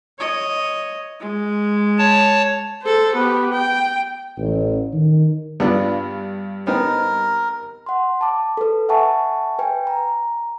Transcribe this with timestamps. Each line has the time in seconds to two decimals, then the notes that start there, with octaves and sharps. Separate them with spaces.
0.19 C#5 D#5
1.20 G#3
1.98 C#5 A5
2.83 A4 C5
3.15 B3 G4
3.53 G5
4.37 A1
4.94 D#3
5.60 G2 B3 D4 F4
6.67 B3 C4 D#4 A#4
7.86 F#5 C6
8.21 A5 D6
8.57 A4 B4
8.89 E5 F#5 G#5 A5 C#6
9.59 B4 G5 G#5
9.87 A#5